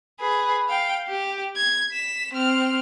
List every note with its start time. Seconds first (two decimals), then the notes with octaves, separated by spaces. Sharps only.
0.20 G#4 B4
0.68 F5 G5
1.08 G4
1.56 G#6
1.92 B6 E7
2.34 C4 F6